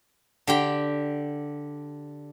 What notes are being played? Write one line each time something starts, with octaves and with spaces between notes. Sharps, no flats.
D3 G4 G5